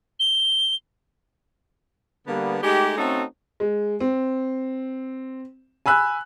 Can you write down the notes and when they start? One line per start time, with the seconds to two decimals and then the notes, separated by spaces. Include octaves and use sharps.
0.20 G7
2.27 D3 G3 A#3 B3
2.63 G#3 A3 D#4 G4
2.98 A3 C4 C#4 D#4 F#4 A4
3.60 G#3
4.00 C4
5.86 G#5 B5 E6 F#6